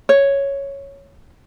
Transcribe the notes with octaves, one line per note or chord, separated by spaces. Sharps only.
C#5